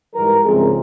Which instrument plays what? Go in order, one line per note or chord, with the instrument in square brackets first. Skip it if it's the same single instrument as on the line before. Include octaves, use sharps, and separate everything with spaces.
[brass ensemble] G#2 E3 G3 A#4
C#2 C3 F3 G#3 C4 G#4